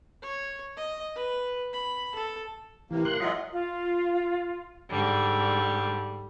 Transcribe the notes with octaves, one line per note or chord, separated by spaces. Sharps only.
C#5
D#5
B4
B5
A4
A2 C3 E3 A#3
A#4 C6 F#6
F#3 G#3 F4 D#5 E5 F#5
F4
G#2 D3 G3